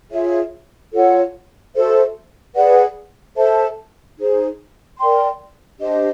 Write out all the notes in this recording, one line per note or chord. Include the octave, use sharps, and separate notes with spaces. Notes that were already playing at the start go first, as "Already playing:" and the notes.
F4 G#4 C#5 E5
F4 A4 C#5 F#5
F#4 A4 C5 E5
G#4 B4 D5 F#5
A4 C5 E5 A5
D#4 G#4 C5
A#4 D5 G5 C6
D4 G4 C5 D#5